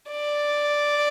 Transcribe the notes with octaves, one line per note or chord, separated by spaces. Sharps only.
D5